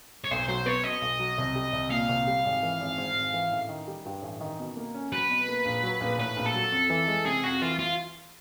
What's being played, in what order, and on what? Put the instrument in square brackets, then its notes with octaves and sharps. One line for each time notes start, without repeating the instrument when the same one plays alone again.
[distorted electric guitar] C#5
[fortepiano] B1 [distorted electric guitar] C5
[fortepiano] F#3 [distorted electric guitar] C5
[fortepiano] B3 [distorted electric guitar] C#5
[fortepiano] B2 [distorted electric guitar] D#5
[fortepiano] B1
F#3
C2
G3
C2
[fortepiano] A#2 [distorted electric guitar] F5
[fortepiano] C2
G3
G#1
E3
G#1
G#2
G#1
E3
A1
D#3
G3
G2
A1
D#3
B2
A#3
C#4
[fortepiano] F#3 [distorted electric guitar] B4
[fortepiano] B2
A#3
A#1
F#3
A#1
[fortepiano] A2 [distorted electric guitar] B4
[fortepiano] A#1
[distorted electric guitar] A4
[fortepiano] F#3
F2
E3
G#3
[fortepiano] C3 [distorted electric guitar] G#4
[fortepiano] F2 [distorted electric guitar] F#4
[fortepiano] E3 [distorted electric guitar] F4
[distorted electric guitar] F4